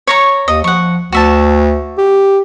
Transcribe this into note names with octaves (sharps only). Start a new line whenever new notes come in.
C#5 A#5 C#6
D#2 D#5
F3 F#5 C#6
D2 F#4 E5 A5
G4